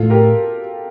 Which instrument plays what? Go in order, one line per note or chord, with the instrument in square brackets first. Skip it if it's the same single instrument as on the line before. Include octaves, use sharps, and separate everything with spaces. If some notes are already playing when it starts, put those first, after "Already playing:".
Already playing: [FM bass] A2 [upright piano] F4 A4
[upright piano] G4 A#4